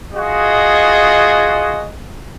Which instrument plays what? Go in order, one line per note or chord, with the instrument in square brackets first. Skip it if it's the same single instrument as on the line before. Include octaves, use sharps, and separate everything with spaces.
[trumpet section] F4 F#4 G#4 D#5